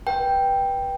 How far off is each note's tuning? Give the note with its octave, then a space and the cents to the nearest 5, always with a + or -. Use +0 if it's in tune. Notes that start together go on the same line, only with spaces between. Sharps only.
B4 -20 G5 +0